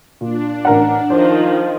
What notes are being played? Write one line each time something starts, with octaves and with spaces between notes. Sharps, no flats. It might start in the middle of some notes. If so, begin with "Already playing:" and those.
A#2 D4
A1 A#4 F#5
D#3 F3 C5